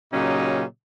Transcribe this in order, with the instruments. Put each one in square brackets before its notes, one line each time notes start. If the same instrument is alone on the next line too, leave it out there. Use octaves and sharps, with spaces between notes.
[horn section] A#2 C#3 F#3 C#4 D#4 G4